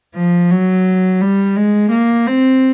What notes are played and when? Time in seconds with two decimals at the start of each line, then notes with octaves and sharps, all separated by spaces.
0.15 F3
0.51 F#3
1.21 G3
1.56 G#3
1.91 A#3
2.27 C4